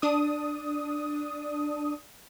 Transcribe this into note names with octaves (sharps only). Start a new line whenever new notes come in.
D4 D#6